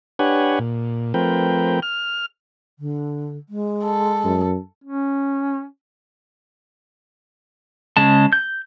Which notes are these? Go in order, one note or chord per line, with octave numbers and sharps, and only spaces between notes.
D4 G4 B4 C#5 F#5 G#5
A#2
F3 A3 C4 A#4 B4 G5
F6
D3
G#3
A4
F#2
C#4
C#3 G#3 A5
G6